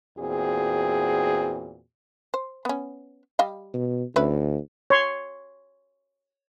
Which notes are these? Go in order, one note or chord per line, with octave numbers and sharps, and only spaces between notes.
E2 A#2 C4 F#4 G#4
C5
B3 C#4
G3 D#5 F5
B2
D2 C#4 E4 B4
C#5 C6